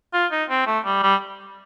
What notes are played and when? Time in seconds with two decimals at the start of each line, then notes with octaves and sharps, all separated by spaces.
0.14 F4
0.32 D#4
0.49 C4
0.67 A3
0.85 G3
1.03 G3